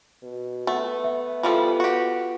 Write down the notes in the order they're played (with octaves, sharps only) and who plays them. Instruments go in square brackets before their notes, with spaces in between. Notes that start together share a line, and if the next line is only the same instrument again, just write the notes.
[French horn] B2
[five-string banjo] A3 [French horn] B3 [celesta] F#5
[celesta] E5
[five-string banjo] E3 F3 G3 [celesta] F4 A4
[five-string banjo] F#4 G4